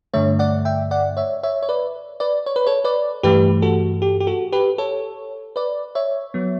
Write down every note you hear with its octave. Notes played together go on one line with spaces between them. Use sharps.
G2 D3 A3 C#5 E5
D5 F#5
E5 G5
D5 F#5
C#5 E5
C#5 E5
C#5
B4 D5
B4 D5
C#5
B4
A4 C#5
B4 D5
G2 E3 A3 G4 B4
F#4 A4
G4
G4
F#4 A4
G4 B4
A4 C#5
B4 D5
C#5 E5
F#3 B3